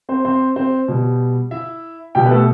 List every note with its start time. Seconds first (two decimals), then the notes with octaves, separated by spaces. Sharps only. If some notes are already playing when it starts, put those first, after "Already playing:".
0.09 C4 C5
0.25 C4 C5
0.56 C4 C5
0.88 B2 G3
1.51 E4 E5
2.15 B2 G3 G4 G5
2.26 B4
2.31 A3 A4